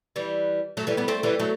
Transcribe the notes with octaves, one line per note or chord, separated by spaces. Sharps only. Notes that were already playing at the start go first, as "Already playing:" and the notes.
E3 G3
F#3 A3
E3 G3
G3 B3
A3 C4
E3 G3
F#3 A3